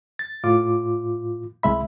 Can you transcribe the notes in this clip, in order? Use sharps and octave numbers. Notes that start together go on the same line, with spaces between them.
A6
A2 F4 D6
C2 G#3 E5 B5